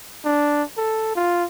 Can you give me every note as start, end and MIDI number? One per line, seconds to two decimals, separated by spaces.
0.25 0.63 62
0.77 1.13 69
1.16 1.45 65